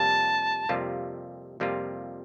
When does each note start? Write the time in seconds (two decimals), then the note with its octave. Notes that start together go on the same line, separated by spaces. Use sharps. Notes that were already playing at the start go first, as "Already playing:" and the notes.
Already playing: F2 C3 G3 A#3 F4 A5
0.69 F2 C3 G3 A#3 F4
1.60 F2 C3 G3 A#3 F4